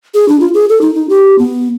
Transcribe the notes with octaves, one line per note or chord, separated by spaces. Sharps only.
G#4
D4
F4
G#4
A4
D#4
D#4
G4
B3